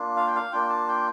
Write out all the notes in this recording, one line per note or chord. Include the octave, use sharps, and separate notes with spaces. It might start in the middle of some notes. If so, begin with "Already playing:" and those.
Already playing: A#3 D4 F4
F5
G5
F5
A#3 D4 F4 G5
A5
G5